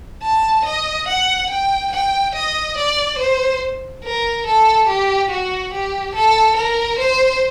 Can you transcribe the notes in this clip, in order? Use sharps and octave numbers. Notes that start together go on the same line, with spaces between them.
A5
D#5
F#5
G5
G5
D#5
D5
C5
A#4
A4
G4
F#4
G4
A4
A#4
C5